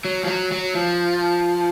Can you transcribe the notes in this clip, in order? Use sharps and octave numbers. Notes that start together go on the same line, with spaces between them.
F#3
F3
F#3
F#3
F3